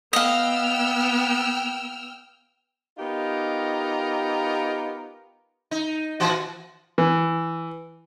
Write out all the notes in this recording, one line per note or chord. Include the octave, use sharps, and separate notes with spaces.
B3 D#5 F5 G5 E6 F6
B3 D#4 F4 G4 A#4
D#4
A#2 E3 F#4
E3